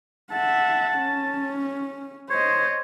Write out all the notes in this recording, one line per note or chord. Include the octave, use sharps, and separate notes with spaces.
E5 F#5 A5
C#4
C5 C#5 D#5